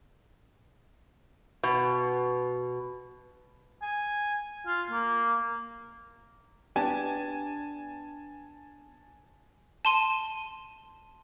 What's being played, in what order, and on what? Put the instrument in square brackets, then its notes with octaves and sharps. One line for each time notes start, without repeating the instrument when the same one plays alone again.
[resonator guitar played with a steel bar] B2
[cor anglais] G#5
F4
A#3
[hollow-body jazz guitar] B3 D4 G4 [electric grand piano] G#5 A5
[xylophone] A5 C6 D#7